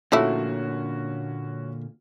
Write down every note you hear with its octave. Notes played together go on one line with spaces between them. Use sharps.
A#2 D3 F3 A3 A#3 C#4 E4 F#4